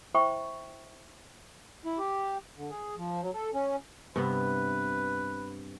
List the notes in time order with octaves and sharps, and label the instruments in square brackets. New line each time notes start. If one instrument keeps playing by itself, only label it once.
[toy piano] E4 C5 E5 G5 B5 C#6
[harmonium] E4
G4
D3
G#4
F3
F#3
A4
C#4
[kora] G2 C3 B3 [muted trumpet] B4